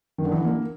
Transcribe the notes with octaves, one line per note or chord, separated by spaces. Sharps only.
D#3
D3
E3
D3
A#3